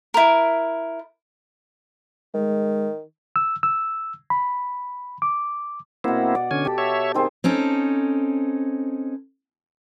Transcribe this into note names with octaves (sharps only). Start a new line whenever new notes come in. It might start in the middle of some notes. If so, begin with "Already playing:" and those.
E4 A#4
D#3 G#3
E6
E6
B5
D6
B2 A#3 C4 E4 F#5
D5
D3 C#4 G#5
G4 A4
C#5 E5
D#3 C4 G#4
C4 C#4 D#4 A4